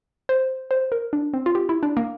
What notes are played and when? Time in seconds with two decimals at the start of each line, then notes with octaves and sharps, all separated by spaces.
0.29 C5
0.71 C5
0.92 A#4
1.13 D4
1.34 C4
1.46 F4
1.55 G4
1.69 E4
1.83 D4
1.97 A#3